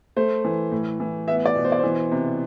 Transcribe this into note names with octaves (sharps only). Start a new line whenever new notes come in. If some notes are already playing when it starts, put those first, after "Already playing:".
A3 C5
E3
A2
E3
B3 E5
D5
B2
C5
D5
E3 C5
C3